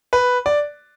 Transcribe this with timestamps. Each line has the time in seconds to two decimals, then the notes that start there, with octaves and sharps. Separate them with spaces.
0.13 B4
0.46 D5